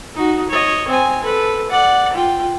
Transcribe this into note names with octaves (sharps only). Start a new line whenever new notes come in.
D#4 F#4
C#5 D#5
C4 G#5
A4 B4
D5 F#5
F4 G5